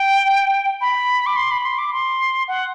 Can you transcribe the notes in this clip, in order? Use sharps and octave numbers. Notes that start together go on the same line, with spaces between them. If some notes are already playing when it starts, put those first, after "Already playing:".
Already playing: G5
B5
D6
C6
B5
C6
D6
C6
F#5